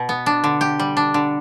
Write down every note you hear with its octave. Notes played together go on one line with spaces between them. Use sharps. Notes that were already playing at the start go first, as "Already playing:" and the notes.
Already playing: B2
B3
D4
D3
G4
G3
D4
D3